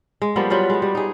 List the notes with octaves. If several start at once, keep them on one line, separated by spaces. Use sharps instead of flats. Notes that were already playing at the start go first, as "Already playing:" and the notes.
G#3
F3 G3 A#3 B3
F#3 G3 F4 B4
G#3 B3
G3
D#4 G#4